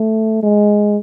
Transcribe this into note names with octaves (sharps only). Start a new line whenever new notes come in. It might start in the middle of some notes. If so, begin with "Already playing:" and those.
Already playing: A3
G#3